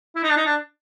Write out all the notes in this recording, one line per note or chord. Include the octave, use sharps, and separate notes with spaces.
E4
D#4
D4
D#4
D4